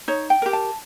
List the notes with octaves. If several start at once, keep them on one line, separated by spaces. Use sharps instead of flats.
D#4 C#5
G5
G4 A#4
A5